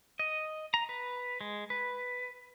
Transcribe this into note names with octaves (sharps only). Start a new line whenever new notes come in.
D#5
A#5
B4
G#3
B4